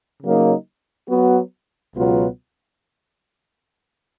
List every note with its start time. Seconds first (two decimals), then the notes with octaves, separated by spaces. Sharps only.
0.22 C#3 F#3 A#3 D#4
1.09 F#3 B3 F#4
1.95 C#2 B2 F#3 B3 F4